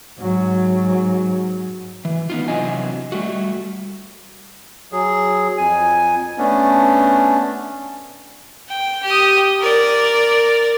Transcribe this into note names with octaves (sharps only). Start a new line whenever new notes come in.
G#2 F#3
E3
B3 D#4 F4
C3 E3 F#3 D4 D#5 G#5
G3 A3 F#4
F#3 G#4
F2 G#5
A3 B3 C#4 D4
G5
G4 D#6
A#4 D5